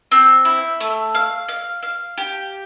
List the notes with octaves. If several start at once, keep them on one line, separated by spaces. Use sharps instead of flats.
C4
E4
A3
F5
F5
F5
G4